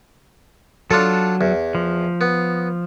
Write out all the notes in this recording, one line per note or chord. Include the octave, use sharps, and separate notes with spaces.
F#3 D4 F4 A4
E2
F3
B3